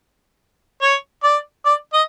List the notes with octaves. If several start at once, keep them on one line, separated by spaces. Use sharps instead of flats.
C#5
D5
D5
D#5